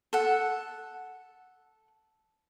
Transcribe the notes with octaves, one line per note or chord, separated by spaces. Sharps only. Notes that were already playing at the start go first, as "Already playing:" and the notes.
A4 F#5